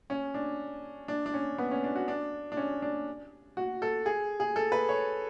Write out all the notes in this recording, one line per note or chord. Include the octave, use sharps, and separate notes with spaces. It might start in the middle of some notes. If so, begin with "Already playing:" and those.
C#4
D4
D4
D4
C#4
B3
C#4
D4
F#4
D4
D4
C#4
D4
F#4
A4
G#4
G#4
A4
B4
C#5